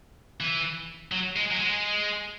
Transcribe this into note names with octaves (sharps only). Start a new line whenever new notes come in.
E3
F#3
G#3
F#3
G#3